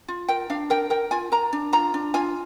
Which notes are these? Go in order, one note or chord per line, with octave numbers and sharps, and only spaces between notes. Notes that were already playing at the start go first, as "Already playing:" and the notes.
F4
A#4 G5
D4 F5
A#4 G5
A#4 G5
F4 G#5
A#4 A#5
D4
F4 A#5
D4
F4 G#5